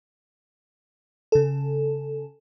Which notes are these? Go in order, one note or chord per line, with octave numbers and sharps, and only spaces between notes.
C#3 A4